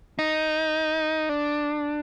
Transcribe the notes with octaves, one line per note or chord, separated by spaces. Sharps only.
D#4
D4